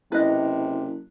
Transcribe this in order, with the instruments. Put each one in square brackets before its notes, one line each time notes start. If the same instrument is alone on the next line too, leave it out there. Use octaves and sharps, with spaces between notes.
[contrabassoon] F#1 [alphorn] C3 [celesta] E4 F#6 [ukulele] B4 D#5